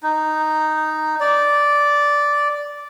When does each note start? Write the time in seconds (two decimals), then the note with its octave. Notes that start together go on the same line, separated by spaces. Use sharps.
0.03 D#4
1.20 D5